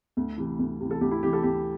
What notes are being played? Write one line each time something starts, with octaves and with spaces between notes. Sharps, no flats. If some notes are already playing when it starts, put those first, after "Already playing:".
D2
C3 E3
D2
C3 E3
A4
D2 G4
E4
C3 E3 G4
A4
D2 G4